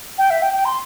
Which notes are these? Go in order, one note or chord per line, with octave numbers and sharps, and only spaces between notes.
G5
E5
G5
G5
C6